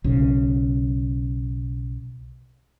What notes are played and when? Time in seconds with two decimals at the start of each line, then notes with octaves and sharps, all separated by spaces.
0.04 B1 C#3